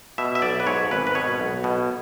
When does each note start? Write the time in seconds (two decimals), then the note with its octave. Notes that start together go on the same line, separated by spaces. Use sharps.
0.18 B2 E5
0.35 E5
0.42 B1 D5
0.60 B4
0.66 G#2 C#5
0.91 G#1 B4
1.07 B4
1.15 B2 C#5
1.40 B1
1.64 B2